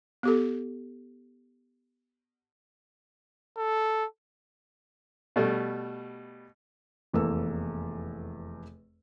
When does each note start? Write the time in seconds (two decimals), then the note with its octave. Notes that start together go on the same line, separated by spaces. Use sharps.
0.23 B3 G4 A4
3.57 A4
5.36 B2 G3 A3
7.13 F1 E2 A#3 A4 E6